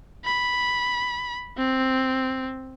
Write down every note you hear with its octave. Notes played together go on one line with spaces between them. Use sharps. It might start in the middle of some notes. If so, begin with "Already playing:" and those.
B5
C4